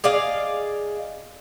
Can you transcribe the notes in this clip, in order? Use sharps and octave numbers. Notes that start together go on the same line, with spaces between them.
G#4 D5 D#5 F5